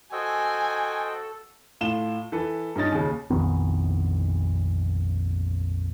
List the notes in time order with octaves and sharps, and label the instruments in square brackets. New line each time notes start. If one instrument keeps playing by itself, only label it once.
[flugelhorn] F#4 [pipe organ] A4 [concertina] C5 D#5 G5 [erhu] G#5
[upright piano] A2 F4 E7 G7
E3 A4 B4
G2 C#4 D#4 A6
D#2 C#3
[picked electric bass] A#1 F2 D#3 B3